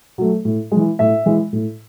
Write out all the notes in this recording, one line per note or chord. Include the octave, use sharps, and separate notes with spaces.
F#3 A3
A2
G#3
E3
A2 E5
E3 G#3
A2